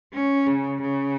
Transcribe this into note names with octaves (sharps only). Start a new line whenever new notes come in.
C#4
C#3
C#3